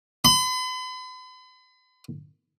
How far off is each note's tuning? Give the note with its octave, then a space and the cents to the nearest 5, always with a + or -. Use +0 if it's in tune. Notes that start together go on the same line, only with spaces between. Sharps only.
B5 +45